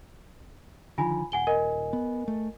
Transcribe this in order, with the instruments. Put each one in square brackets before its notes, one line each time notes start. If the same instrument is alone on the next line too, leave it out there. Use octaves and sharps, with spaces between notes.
[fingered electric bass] D3 D#3 F3 [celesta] F4 G#5 B5
[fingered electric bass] D#1 [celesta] F#5 G#5 G7
[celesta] A#4 D#5 G#5
[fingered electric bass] B3
A3